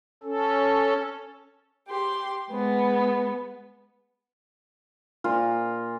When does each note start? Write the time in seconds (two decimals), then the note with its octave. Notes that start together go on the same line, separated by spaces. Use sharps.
0.23 C#4 A4
1.87 G4 C6
2.50 G#3 B3
5.24 A#2 F4